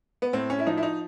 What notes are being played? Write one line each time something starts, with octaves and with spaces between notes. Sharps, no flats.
B3
A2 C4
C#4
E4
F3 D#4
E4
D#4